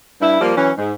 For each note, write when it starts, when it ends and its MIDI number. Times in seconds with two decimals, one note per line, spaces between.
0.21 0.39 43
0.21 0.39 64
0.41 0.55 53
0.41 0.55 55
0.41 0.55 58
0.55 0.71 52
0.55 0.71 54
0.55 0.71 61
0.78 0.92 44